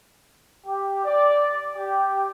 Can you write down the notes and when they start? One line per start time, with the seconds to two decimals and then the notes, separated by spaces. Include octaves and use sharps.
0.66 G4
1.05 D5
1.76 G4